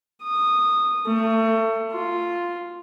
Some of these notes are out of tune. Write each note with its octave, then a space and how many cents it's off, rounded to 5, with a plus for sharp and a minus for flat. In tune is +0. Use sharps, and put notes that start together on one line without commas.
D#6 -15
A3 +25
F4 +0